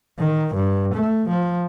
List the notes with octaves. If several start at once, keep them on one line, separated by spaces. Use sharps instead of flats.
D#3
G2
A3
F3